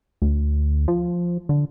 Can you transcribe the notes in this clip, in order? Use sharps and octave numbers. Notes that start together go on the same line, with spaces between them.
D2
F3
D3